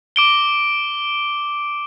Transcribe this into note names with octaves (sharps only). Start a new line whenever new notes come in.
D6 D7 G7